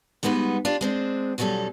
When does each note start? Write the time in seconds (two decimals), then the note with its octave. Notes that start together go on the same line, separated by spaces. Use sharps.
0.23 G3 G#3 B3 D#4 F#4 B4
0.65 D4 F4 G4
0.81 G#3 C4 D4
1.38 E2 B2 F#3 G3 C#4 A4